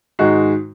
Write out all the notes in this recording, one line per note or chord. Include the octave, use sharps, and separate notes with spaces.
G#2 D#3 G#3 D#4 F#4